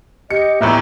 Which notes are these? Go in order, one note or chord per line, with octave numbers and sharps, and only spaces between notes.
G4 D#5 C#7
A#1 E2 A2 E5 A#5